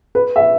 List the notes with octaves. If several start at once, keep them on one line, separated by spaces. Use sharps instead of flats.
B4
E5